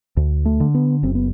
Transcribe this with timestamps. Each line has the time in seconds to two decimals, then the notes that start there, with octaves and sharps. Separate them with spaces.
0.17 D2
0.45 A3
0.60 D3
0.74 B3
1.03 F#1 C4
1.15 B3